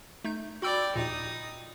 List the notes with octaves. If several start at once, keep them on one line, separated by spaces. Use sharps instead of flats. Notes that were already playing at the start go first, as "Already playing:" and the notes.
A3 D#4 G6
F#4 D5 G5 B5 E6
A#1 D#2 A#2 D#4 D#6